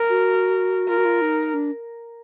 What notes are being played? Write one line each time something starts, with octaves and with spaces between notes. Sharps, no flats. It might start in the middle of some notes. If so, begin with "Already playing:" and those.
Already playing: A#4
F#4
F4 A#4
F#4
F4
D#4
D4